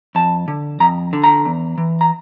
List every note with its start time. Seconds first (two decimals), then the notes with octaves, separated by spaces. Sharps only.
0.15 F2 A5
0.48 D3
0.80 F2 A#5
1.13 D3
1.24 A#5
1.45 E2
1.78 E3
2.01 A#5